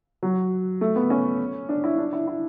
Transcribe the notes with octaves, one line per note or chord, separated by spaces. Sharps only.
F#3
A3
B3
C#4
D4
E4
D4
E4
E4